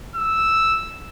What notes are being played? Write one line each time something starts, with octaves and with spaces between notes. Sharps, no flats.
E6